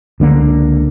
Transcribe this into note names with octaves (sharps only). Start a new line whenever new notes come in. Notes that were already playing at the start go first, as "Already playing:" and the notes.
C#2 D3 A#3